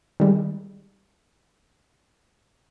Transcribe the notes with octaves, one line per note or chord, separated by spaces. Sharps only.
D#3 G3 G#3